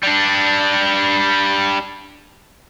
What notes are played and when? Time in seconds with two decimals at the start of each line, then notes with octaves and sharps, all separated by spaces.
0.03 G3 D4